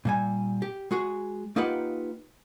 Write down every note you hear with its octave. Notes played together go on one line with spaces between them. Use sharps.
A#2 G3 G#5
G4
G#3 F#4 G#4
A#3 D#4 F4 G4 B4 F#5